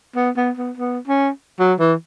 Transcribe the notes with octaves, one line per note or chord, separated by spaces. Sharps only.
B3
B3
B3
B3
C#4
F#3
E3